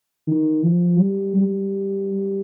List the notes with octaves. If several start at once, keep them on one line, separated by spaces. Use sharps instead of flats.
D#3
F3
G3
G3